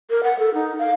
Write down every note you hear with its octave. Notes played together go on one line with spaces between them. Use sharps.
A#4
F#5
A4
D#4
F5